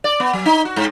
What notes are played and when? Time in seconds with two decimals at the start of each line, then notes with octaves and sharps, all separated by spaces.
0.04 D5
0.20 B3
0.33 F#3
0.45 D#4
0.65 F#4
0.76 G#2